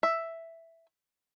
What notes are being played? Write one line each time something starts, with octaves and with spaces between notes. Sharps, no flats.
E5